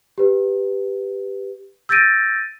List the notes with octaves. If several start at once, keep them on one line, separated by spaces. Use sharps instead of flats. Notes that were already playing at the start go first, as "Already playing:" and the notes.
G4 B4
E6 G6 A6 A#6 D7 D#7